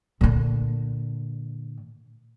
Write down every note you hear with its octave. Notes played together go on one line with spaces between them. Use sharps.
A#2 D3